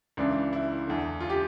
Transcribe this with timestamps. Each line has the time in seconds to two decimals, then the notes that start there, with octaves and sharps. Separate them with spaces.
0.17 C#2 C#3 E3 D4
0.53 E4
0.87 E2 D3
1.21 F4
1.30 G4